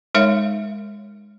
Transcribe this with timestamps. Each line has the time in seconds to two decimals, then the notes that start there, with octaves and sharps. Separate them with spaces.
0.15 G#3 D#4 A#4 C#5 E5 F5